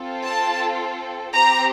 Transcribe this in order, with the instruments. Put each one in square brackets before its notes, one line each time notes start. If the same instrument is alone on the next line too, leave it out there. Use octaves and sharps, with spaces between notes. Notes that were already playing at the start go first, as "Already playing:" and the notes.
Already playing: [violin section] C4 F4 A4
A5
C4 G4 A#5